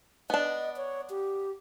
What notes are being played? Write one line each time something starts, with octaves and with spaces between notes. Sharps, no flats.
B3 D4 D#5
C#5
G4